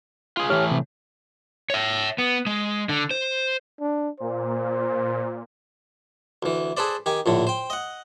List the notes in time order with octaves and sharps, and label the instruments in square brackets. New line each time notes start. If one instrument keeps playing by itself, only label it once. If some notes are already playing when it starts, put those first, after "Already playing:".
[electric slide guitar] F4 G#4
[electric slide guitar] A2 E3 [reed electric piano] G4 C#5 F6
[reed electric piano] C3
[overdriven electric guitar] C#5 E5
B3
G#3
D3
C5
[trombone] D4
[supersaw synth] A#2 [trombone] C5
[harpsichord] D2 E3
G#4 A4 B4 C5 D5
D#3 G4 G#5
A#1 A2 D3
C5 G5
D#5 F#5